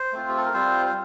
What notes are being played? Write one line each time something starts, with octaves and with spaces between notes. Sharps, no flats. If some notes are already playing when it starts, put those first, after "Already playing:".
Already playing: C5
A3 C4 F4
G4
A4
A#4
G3 C4 F4 C5
C5